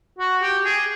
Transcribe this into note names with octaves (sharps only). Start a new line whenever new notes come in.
F#4
G4
G#4